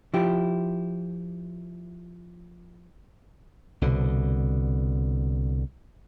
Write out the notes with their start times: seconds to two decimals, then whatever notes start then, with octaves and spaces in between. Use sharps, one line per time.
0.14 F3 E4 G4
3.81 C2 B2 D3